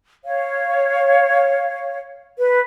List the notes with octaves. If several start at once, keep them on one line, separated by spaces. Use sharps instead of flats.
C#5 F5
B4